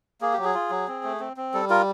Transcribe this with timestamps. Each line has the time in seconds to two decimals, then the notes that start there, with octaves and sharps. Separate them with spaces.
0.21 A#3 G#4
0.33 F#3 G4
0.44 G#4
0.54 F4
0.70 F#3
0.88 C4
1.04 A3
1.20 C4
1.37 C4
1.54 G3 A4
1.70 F4 A#4